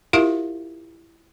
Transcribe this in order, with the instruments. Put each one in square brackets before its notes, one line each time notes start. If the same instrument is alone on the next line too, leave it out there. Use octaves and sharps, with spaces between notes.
[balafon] E4 F4 G4 A#4 E5 F5